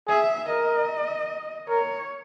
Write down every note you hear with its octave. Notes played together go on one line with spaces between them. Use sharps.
G#4 E5
A#4 D#5
A#4 C#5